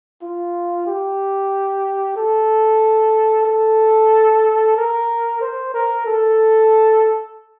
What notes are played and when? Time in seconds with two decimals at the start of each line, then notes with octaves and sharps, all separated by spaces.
0.22 F4
0.87 G4
2.16 A4
3.46 A4
4.77 A#4
5.41 C5
5.74 A#4
6.06 A4